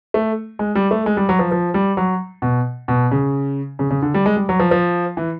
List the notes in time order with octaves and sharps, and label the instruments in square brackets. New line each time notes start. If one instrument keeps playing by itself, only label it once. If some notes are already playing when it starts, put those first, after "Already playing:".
[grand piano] A3
G#3
G3
A3
G#3
G3
F#3
F3
F3
G3
F#3
B2
B2
C#3
C#3
C#3
D3
G3
G#3
G3
F#3
F3
F3
E3